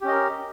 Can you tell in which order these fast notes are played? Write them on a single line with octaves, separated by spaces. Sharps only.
G4 C#4 D#5 A#4